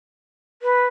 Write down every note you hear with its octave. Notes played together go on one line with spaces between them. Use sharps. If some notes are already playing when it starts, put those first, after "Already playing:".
B4